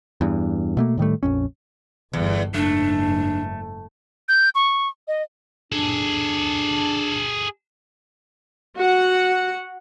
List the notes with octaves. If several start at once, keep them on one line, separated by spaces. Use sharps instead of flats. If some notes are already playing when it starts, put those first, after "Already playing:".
E2 G2
B2 A3 A#3
A2 D#3 G3 A3
A#1 F2 C#4
G1 E2
F#1 G#2 A3 D4
G6
C#6
D#5
D4 G#4 A4
F#4 F#5